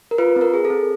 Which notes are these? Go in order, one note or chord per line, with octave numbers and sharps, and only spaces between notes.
A#4
F4 B4
C4
A#4
G#4
A4
C4